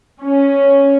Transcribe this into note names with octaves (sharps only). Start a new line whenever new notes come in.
C#4